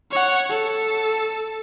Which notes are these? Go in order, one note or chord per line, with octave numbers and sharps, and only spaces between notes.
C#5 F#5
A4